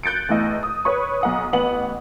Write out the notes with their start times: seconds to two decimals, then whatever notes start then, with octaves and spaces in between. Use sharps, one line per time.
0.03 F#6 G6 A6 C#7 D7
0.29 E2 A2 D#5
0.63 D#6
0.85 B4 C#5 C#6
1.21 B1 F#5 D#6
1.53 A1 B3 F#5 F#7